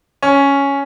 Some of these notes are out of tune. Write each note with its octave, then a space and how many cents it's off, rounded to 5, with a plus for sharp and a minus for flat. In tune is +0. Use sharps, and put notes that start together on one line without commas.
C#4 +5